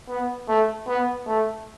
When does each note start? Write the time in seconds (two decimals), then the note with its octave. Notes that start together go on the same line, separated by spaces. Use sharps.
0.08 B3
0.48 A3
0.87 B3
1.27 A3